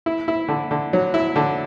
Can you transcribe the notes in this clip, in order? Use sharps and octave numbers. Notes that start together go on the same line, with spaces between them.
E4
E4
D3
D3
F#3
E4
D3